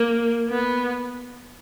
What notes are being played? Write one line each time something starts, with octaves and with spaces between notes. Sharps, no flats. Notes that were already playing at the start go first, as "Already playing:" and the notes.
Already playing: A#3
B3